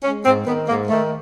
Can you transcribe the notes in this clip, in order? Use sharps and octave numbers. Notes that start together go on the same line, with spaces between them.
G#3 C#4
G#2 C4
D#3 B3
G#2 A#3
D#3 A3